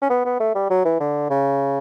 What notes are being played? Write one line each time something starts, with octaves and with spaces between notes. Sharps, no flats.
C#4
B3
B3
A3
G3
F#3
E3
D3
C#3